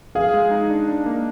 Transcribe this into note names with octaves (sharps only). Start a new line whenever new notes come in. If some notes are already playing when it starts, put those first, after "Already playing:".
G#4 F5
G#3
D#4
D4
D4
A#3